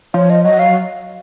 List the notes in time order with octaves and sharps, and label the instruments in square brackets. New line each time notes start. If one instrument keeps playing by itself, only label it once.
[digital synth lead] F3 [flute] C#5
[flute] D#5
[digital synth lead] F#3 [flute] D#5
[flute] F5